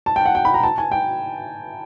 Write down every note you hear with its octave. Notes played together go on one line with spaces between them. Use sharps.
A5
G5
F#5
G5
B5
A#5
A5
G#5
G5